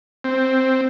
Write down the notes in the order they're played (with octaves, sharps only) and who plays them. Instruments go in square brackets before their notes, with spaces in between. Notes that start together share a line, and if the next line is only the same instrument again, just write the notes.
[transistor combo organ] C4